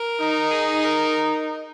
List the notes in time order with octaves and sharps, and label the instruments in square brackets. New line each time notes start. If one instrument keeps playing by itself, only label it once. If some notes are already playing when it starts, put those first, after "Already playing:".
Already playing: [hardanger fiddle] A#4
[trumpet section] D#4
[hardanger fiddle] G#4
A#4